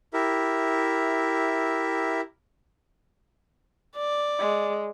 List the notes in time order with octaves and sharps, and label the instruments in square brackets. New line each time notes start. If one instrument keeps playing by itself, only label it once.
[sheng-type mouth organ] E4 G4 A#4 E5
[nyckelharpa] D5
[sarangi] G#3